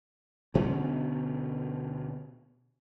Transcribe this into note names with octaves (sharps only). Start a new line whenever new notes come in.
D2 B2 D3 C#4